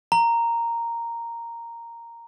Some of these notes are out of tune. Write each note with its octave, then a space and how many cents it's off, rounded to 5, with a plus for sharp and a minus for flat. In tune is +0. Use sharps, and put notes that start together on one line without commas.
A#5 -5